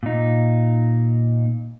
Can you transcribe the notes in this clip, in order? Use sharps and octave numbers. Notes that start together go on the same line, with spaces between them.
A#2 D#4